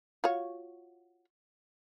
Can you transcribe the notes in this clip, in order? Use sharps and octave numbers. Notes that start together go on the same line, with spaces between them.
F4 F#4 C#5